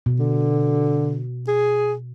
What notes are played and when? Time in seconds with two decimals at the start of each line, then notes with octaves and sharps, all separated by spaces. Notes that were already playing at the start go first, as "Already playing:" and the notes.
0.06 B2
0.20 D3
1.48 G#4